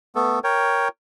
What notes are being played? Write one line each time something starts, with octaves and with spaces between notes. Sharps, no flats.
A3 B3 A4
A#4 C#5 G5